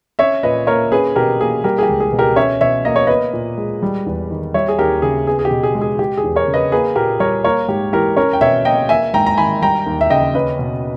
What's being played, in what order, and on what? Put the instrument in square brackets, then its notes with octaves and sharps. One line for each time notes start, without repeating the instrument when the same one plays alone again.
[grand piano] C#4 C#5 E5
A#2 B4 D#5
A#3 A#4 C#5
C#4 G#4 B4
B2 G4 A#4
A#3 G#4
G3 G4 A#4
G#4
G4
C#2
G#4
B2
G4 A#4
C#4 C#5 E5
B2 C#5 E5
A#3 D#5
C#5
B3 B4 D#5
A#2
G#3
G3
E2
D#3
G3 C#5 E5
G#4
D#2 G4 A#4
C#3 G#4
B3 G#4
G#4
G4
B2
G#4
G#3
G#4
G#3 G4
G#4
E2
A#4 C#5
C#3
B4 D#5
A#3 G#4 B4
A#2 G4 A#4
G3 A#4 C#5
A#3 A#4 C#5
G#2 G4
E3 G4 A#4
C#4 A#4 C#5
G5
B2 C#5 E5
A#3 D#5 G5
A#3 E5 G#5
G#2 G5 A#5
A#5
D#3 G#5 B5
G3 G5 A#5
D#2
E5
C#3 D#5 G5
C#4 B4 D#5
B2